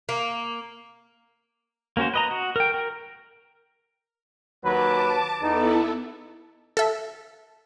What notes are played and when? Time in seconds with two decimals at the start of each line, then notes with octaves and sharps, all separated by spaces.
0.09 A#3
1.97 A#3 C#4 F#4 C5
2.14 B4 D#5 A#5
2.31 F#4
2.56 A#4 G5
2.74 A#4
4.63 D#2 F#3 B4 A5 D6
5.41 E2 B3 D#4 E4 A4
6.77 A4 E5